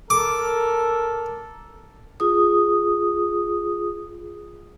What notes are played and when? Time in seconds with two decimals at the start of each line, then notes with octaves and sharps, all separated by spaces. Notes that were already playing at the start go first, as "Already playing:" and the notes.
0.10 A4 A#4 D6
2.20 F4 G#4 D#6